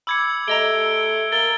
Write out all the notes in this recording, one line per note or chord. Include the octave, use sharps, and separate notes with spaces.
B5 D6 E6 G#6 C#7
A3 G4 D#5 A#5 D7 G7
A#4 A6 G7